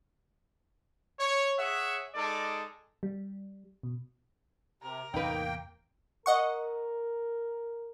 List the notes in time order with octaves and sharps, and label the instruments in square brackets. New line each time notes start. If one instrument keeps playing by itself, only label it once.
[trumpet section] C#5
G#4 C#5 E5 F#5
G#3 D#4 A4 D5
[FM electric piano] G3
B2
[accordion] C3 [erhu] A#4
[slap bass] E2 A2 C3 [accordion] A#3 G5 [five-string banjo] D#4 B4
[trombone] A#4 [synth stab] D#5 F#5 C#6